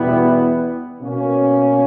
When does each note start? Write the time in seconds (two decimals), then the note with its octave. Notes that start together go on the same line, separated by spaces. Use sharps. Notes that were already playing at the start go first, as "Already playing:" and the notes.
Already playing: E2 B2 G3 B3 E4
1.01 B2 A#3 C#4